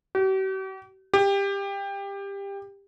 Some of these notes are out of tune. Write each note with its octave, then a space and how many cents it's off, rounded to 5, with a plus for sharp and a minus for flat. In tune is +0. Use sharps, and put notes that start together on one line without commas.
G4 -45
G4 +20